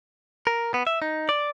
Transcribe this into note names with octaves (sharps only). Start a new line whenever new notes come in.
A#4
B3
E5
D#4
D5